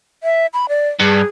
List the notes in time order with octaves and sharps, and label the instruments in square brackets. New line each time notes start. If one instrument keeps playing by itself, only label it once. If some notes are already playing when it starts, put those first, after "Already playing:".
[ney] E5
B5
D5
[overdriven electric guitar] G2 [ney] G#4